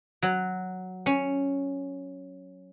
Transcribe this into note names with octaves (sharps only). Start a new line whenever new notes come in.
F#3
C#4